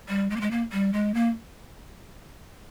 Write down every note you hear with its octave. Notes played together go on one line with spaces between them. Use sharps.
G3
G#3
A#3
G#3
A#3
G3
G#3
A#3